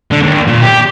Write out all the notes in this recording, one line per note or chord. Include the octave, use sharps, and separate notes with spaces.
D3 D4
D#2
A#2
G4